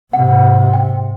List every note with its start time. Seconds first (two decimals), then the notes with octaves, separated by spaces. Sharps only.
0.13 G#2 C3 F#5
0.73 G5